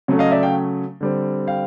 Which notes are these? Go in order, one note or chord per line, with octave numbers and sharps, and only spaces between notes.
C#3 F#3 A3 C#4
D#5 F5
D5 E5
F5 G5
D3 G3 C4
F5 G5